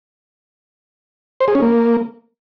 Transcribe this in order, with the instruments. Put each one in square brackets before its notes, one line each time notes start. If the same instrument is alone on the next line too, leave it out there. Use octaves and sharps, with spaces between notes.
[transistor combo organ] C5
G#4
C#4
A#3